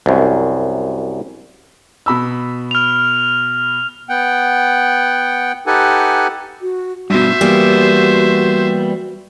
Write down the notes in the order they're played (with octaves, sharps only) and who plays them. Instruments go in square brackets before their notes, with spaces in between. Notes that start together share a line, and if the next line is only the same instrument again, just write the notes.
[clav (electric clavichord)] C2 F#2
[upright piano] B2 B5 E6
[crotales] F6 F7
[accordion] B3 F#5 G5
D#4 G4 A4 B4 F#5 G#5
[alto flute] F#4
[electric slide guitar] G2 B2 [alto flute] F#4 [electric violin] C5 E5
[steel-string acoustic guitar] E3 A#3 B3 [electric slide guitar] G3